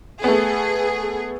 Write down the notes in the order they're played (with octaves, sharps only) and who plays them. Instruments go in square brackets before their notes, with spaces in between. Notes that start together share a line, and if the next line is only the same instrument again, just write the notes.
[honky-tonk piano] A3 B3 [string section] G#4